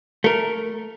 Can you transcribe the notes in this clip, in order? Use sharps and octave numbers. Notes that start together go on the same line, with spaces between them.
A3 A#4